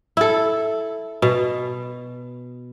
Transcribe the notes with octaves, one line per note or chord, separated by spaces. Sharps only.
E4 A4
B2